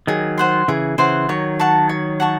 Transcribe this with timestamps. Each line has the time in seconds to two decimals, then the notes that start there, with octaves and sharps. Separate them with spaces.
0.07 D#3 F#3 G#4
0.38 C5 F#5 C6
0.68 C#3 E3 G#4
0.98 C#3 E3 C5 F#5 C6
1.29 D#3 F#3 C#5
1.59 F#5 A5 C#6
1.89 C#5
2.20 F#5 A5 C#6